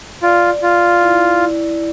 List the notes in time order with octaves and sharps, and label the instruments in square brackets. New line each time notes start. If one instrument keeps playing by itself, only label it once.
[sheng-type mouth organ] F4 [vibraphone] D5
[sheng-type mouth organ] F4 [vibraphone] D5
[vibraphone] E4
E4